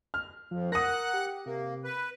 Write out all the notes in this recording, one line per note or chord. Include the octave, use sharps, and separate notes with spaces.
F6
F2 F3
A#4 F#5 D#6 F#6 A#6
G4
C3 A#3
B4